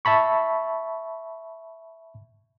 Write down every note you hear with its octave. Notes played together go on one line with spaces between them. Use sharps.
E5 A5 B5 C#6